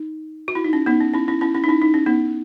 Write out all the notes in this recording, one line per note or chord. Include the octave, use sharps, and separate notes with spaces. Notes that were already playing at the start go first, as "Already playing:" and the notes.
Already playing: D#4
F#4
E4
D#4
C#4
B3 D#4
C#4
C#4 E4
C#4 E4
C#4 E4
C#4 E4
D#4
C#4 E4
D#4
C#4
B3 D#4